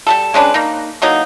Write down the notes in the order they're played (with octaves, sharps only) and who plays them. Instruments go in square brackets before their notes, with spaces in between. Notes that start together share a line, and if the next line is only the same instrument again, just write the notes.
[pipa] G3 G#3 A4
G#3 C#4 D4 B4
A#3 D#4
E3 F#3 A#3 D#4